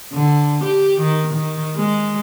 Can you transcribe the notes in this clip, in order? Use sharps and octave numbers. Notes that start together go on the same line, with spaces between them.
D3
G4
D#3
D#3
G#3